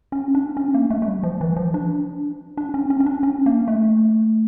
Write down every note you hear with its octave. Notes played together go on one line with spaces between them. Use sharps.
C#4
D4
C#4
A#3
A3
A3
G3
F3
E3
F3
D4
D4
C#4
C#4
C#4
D4
C#4
A#3
A3